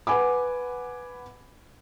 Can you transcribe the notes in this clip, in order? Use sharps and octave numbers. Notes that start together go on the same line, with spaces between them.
B4 F#5 G#5 B5 D6